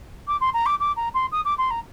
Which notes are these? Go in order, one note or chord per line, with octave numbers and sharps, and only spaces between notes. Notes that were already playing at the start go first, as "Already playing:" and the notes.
D6
C6
A#5
D6
D6
A#5
C6
D#6
D6
C6
A#5